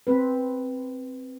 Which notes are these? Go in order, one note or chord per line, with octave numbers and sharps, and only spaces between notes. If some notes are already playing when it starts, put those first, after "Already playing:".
C4 B4